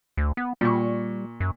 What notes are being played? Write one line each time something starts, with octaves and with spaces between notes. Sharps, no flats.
D2
B3
A#2 G3 C#6
F#2